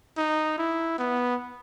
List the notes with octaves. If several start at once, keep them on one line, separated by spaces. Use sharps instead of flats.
D#4
E4
B3